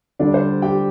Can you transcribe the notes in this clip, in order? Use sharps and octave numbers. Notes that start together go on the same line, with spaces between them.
D3 G3 D4 D5
C5
G4 G5